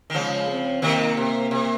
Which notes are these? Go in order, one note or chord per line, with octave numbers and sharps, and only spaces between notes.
D#3
C#3 F3 G#3
C4
C3 D#3 A#3
C3
C3